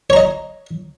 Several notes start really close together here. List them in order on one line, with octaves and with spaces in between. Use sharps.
C#5 A#5 D#5